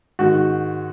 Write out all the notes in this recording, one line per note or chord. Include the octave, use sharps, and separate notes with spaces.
G#2 D#3 G#3 F#4